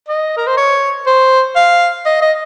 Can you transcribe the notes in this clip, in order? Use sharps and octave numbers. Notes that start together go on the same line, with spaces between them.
D#5
A#4
C5
C#5
C5
F5
D#5
D#5